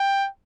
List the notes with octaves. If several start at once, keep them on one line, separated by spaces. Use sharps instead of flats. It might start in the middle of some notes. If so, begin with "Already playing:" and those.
Already playing: G5